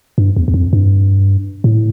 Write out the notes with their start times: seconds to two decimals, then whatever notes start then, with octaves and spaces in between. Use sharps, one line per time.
0.18 G2
0.37 E2
0.48 E2
0.54 F2
0.73 G2
1.64 A2